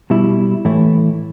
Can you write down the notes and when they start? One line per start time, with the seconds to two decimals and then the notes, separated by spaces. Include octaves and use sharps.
0.10 B2 G3 E4
0.65 A2 E3 A3 E4